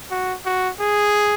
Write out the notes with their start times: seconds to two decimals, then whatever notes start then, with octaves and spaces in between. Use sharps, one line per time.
0.11 F#4
0.46 F#4
0.80 G#4